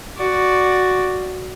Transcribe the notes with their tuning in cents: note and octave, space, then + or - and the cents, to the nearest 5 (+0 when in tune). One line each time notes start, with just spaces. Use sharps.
F#4 +0 D5 +0